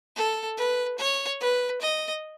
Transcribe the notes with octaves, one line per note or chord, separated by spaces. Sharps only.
A4
B4
C#5
B4
D#5